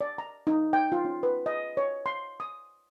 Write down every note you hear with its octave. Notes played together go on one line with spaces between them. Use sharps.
D5
A#5
D#4
G5
F4
C#4
B4
D#5
C#5
C6
D#6